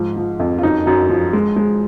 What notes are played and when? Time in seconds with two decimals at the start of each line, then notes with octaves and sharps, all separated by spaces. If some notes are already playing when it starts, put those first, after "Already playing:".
Already playing: G#2 F3
0.16 F3
0.40 F2
0.59 F4
0.63 F#2 D#4
0.86 F#2 D#4 F#4
1.09 F3
1.33 G#3
1.56 G#3